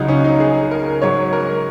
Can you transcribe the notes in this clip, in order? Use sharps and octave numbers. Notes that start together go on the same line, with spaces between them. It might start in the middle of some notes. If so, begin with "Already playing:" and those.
Already playing: C#2 C#3 F#3 D#4
C#4
D#4
G#4
A#4
G#2 F#3 C#5
A#4